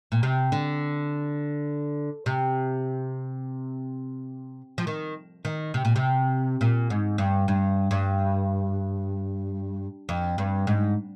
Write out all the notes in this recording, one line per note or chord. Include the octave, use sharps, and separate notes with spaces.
A#2
C3
D3
C3
F3
D#3
D#3
C3
A#2
C3
A#2
G#2
G2
G2
G2
F2
G2
G#2